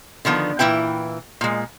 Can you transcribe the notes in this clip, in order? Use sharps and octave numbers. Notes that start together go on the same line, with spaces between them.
D3 D#3 F3 B3
A#2 E3 E4 B4 G5
A#2 G#3